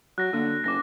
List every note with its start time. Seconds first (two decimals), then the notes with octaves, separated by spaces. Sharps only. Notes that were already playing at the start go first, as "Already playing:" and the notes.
0.18 F#3 F#6 A#6
0.33 D3 A#3
0.64 F#1 D6 A#6